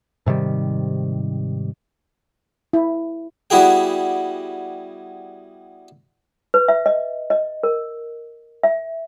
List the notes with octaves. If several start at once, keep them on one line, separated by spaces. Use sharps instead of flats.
G#2 C3 D#3 G3
E4
G3 B3 E4 F#4 G#4 G5
B4
E5
D#5
D#5
A#4
E5